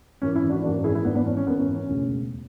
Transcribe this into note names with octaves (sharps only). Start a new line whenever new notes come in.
G#1 F#2 E3 C#4
C#4 E4
D4 F#4
G#1 F#2 E3 D4 F#4
E4 G#4
E4
G#1 F#2 E3 B3 D4
B3 D4
C#4
C#4
G#1 F#2 E3 B3
C#4
C#4
E1 D2 C#3